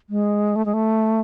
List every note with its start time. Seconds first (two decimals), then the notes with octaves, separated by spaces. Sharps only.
0.10 G#3
0.56 A3
0.66 G#3
0.74 A3